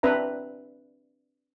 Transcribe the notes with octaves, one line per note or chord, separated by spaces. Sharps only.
C4 D4 B4 E5 A#5